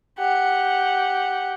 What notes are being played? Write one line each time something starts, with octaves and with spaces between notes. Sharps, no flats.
G4 F#5